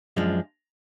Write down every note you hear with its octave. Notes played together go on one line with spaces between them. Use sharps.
F#2 F3 G#3 D4